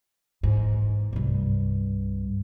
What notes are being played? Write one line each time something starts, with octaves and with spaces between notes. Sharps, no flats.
E2 G#2
C2 G2